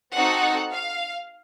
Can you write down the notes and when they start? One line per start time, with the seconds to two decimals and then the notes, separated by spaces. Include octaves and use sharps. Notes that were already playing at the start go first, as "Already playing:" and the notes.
0.13 C4 D#4 F#4 A4 F#5
0.71 F5